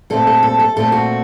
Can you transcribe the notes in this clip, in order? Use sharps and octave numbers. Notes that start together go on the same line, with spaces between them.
A#2 A3 C4 A4
A4
A4
A4
A#2 A3 C4 A4
F#4